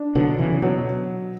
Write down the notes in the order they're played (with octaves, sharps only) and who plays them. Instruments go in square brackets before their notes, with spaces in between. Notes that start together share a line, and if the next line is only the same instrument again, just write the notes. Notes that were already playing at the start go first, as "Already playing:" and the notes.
Already playing: [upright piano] D4
[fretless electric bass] B2 D3 [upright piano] F#3
[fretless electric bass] C#3 E3
C#3
[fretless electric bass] B2 [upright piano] F#3